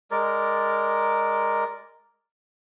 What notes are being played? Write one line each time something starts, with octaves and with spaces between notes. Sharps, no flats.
G#3 A#4 D5